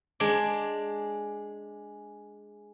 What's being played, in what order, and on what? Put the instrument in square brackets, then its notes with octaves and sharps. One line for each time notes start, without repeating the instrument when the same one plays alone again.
[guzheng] G#3 D4 D5